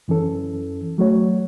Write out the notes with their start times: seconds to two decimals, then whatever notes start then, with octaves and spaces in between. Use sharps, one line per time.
0.08 F#2 E3 C#4 A4
0.98 F#3 A3 F#4 C#5